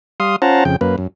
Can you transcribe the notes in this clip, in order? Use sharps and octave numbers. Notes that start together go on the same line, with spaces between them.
G3 F5 C6 D#6
C#4 F4 C5 F#5 A5 A#5
F2 C#3 G5
F#2 A#3 B4
F#2